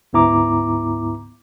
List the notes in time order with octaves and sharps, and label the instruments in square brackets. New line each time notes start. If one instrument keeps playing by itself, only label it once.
[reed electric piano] D2 G#2 B3 E4 A#5 D6